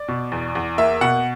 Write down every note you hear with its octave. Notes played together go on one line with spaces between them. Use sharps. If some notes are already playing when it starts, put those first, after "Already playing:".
Already playing: D5
B2
E2
E2
A#3 E5
B2 F#5